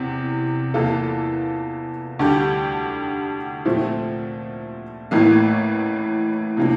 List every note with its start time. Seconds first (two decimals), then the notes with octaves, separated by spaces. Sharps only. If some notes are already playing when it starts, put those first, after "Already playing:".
Already playing: E2 C3
0.74 E2 E3 A#3 F4 A4
2.19 D2 D3 G3 D4 G4
3.65 A#2 F3 A3 C4
5.11 A1 A2 E3 A#3
6.57 C3 F3 A#3 D4